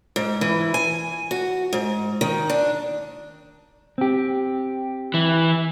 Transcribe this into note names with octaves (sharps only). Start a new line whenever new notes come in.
G#2
E3
G#5
F#4
G#2
D#3
D4
C4 G4
E3